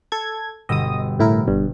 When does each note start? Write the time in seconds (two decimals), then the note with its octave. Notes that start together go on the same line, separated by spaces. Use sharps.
0.12 A4 G#6
0.69 G1 B2 D#5 D#6 E6
1.19 A2 E4 A#4
1.48 G1 G2